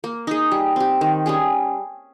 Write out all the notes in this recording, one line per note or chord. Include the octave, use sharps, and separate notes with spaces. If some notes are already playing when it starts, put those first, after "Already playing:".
A#3
D#4 G#4
G3
C4 G4
D#3
G3 C#4 G#4